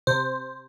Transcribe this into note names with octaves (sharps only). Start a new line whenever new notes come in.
C3 C5